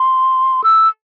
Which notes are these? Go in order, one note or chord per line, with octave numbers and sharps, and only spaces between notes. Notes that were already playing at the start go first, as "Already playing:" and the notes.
Already playing: C6
E6